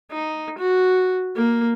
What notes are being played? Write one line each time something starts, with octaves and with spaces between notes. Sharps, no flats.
D#4
F#4
A#3